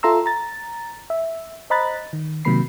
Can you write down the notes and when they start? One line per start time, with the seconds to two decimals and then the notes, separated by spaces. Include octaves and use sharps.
0.03 F4 A4 E5 A#5 C6 E6
0.26 A#5 A6
1.10 E5
1.70 C5 D#5 A#5 B5 F#6 A6
2.13 D#3
2.45 C3 D#3 F#3 A#3 B5 C7